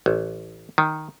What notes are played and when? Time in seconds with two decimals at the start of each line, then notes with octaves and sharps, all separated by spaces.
0.06 A1
0.78 D#3